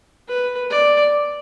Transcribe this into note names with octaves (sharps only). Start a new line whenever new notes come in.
B4
D5